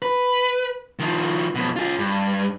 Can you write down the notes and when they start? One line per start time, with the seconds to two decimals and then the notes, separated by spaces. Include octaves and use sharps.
0.02 B4
0.99 D#3 F3
1.55 F2 B2
1.76 F4 G#4
1.99 G2